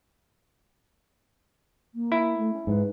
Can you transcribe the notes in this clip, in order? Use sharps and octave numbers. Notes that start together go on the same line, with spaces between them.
A#3
E4
A3
C#4
G#2 B4